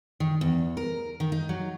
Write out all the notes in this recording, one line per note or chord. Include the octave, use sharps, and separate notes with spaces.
D#3
E2
A#4
D#3
D#4
F#3